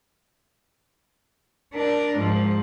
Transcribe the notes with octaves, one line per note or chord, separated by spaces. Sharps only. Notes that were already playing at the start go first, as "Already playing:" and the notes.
D4 A#4
G#2 F3